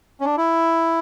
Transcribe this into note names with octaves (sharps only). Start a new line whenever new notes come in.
C#4
D4
E4